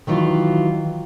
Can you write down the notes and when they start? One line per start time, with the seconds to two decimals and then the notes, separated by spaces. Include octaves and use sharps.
0.07 D#3 E3 F#3 F4